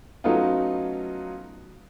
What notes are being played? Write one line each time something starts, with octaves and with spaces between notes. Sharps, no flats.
F#3 A3 B3 C#4 D#4 F4